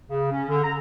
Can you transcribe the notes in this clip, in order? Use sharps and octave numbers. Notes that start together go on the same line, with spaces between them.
C#3
C#4
D3
A#5